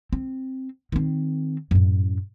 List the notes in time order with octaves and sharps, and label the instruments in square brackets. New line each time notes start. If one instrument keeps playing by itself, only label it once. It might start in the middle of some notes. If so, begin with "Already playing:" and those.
[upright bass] C4
D#3 C4
F#2 A2